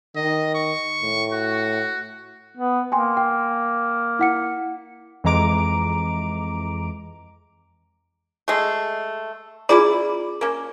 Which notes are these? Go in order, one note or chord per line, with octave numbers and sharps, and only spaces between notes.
D#3 D#5
C#6
A2
F#4
B3
A#3 G5 G#5 C6
G5
E4 F#5 C#7
F2 E3 G#3 A#5 D6 D7
G#3 A3
C#4 E4 F4 G#4 D5 A#5
A#3 C#4